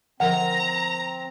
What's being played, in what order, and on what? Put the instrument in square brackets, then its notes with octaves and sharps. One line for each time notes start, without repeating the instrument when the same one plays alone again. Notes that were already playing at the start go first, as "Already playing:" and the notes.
[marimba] D3 F3 A#4 [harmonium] C4 [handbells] F#5 [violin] A#5